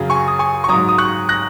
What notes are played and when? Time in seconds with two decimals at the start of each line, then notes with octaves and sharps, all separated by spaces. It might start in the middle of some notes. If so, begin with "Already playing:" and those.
Already playing: F#2 C#3 F#3
0.10 G#5 C#6
0.28 D#6
0.39 G#5 C#6
0.64 C#6
0.69 G#2 F#3 A#5 D#6
0.89 D#6
0.98 C#6 F#6
1.29 F#6 A#6